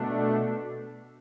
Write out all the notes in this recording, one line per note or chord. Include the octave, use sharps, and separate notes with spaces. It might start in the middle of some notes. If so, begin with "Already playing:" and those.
Already playing: B2 A3 D4